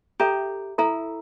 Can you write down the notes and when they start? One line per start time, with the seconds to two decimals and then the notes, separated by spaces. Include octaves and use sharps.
0.20 G4 A4 E5 A#5
0.78 E4 A4 E5 A#5